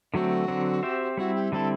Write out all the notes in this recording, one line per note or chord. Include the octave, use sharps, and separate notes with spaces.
D3 F#3 A3 C4 F#4
D3 F#3 C4
C4 G4 C5 E5
G3 C4 E4 F#4
G4
D3 G3 C4 E4 A4